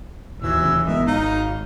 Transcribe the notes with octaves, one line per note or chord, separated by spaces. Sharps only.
A1 D#2 E3 F#3 E6
D#1 C#3
G#1 G#3 B3 A#4 D#5 E5
G#1 D#4 F5